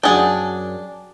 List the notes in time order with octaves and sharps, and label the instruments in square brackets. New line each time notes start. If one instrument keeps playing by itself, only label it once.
[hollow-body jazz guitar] F#2 F#5 G5 [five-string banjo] D4 G#4